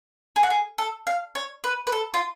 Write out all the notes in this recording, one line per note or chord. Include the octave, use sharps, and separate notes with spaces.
G#4
F#4
G#4
A4
F5
C#5
B4
B4
A4
F4